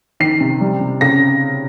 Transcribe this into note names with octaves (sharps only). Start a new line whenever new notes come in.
D#3 C7
C3
G3
C3
C#3 A#6